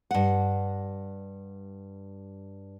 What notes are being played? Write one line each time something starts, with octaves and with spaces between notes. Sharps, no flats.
G2 F#5